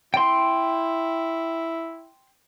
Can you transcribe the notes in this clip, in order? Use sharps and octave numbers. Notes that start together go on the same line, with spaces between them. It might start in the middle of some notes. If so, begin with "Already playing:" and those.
E4 G5 C6